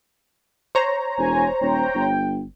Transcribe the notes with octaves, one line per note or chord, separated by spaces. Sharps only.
C5 C#5 A#5
E1 G#5
D#1 G5
G1